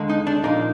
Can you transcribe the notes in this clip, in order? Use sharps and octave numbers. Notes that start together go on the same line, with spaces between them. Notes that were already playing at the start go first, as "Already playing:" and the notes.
Already playing: D#2 D3 G#3
D#4
D4
A#2 F3 A#3 D4 D#4